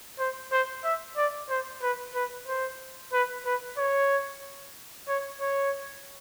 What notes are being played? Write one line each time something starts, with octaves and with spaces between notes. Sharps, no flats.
C5
C5
E5
D5
C5
B4
B4
C5
B4
B4
C#5
C#5
C#5